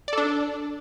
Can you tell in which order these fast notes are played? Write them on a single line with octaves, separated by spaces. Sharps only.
D5 A4 D4